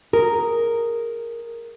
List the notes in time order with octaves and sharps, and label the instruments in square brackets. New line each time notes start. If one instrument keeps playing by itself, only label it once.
[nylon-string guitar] G#4 A#4